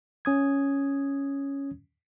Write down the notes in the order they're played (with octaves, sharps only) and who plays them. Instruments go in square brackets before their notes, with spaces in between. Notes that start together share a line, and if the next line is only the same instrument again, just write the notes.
[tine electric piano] C#4 D#6 G#6